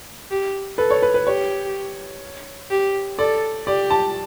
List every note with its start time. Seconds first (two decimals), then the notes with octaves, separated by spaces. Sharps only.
0.31 G4
0.78 A4 B4
0.90 C#5
1.02 B4
1.14 B4
1.27 G4 C#5
2.71 G4
3.18 A4 D5
3.66 G4 D5
3.90 A5